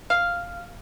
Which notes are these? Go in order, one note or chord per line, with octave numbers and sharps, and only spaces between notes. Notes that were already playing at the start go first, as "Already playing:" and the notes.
F5